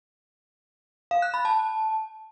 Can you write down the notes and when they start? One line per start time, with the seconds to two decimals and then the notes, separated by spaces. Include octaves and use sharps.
1.11 F5
1.22 F#6
1.34 B5
1.45 A5